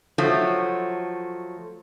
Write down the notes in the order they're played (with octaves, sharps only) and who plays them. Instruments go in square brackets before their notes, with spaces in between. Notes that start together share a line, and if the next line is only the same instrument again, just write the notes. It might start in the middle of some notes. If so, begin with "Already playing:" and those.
[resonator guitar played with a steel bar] F3 F#3 A3